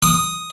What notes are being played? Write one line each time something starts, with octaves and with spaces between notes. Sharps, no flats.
D#6